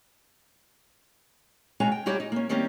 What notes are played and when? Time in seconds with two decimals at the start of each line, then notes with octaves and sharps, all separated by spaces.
1.80 B2 G#3 C#4 F#4 G#5 A#5
1.92 G5
2.06 G3 D#4 F#4 G4 C#5
2.20 D#4
2.32 A#3 C#4
2.49 D#3 G3 A#3 C4 C#4 G4